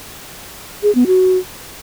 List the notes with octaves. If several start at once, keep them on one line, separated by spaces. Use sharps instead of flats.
G#4
B3
F#4